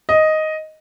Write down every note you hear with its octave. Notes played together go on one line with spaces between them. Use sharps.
D#5